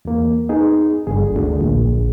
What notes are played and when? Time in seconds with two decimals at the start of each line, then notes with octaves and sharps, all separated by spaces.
0.05 E2 A#3
0.49 B3 D#4 G#4
1.07 G1 D3 G#4
1.36 D2
1.61 A#1